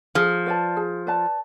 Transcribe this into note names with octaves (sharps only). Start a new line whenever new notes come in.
F3 G#4
B4 D5 A5
G#4
B4 D5 A5